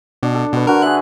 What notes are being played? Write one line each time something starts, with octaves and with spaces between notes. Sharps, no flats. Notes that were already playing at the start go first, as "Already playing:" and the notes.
B2 D4
A4
B2 B4 C#6
D3 F#4 A#4
G#4 E5 F#6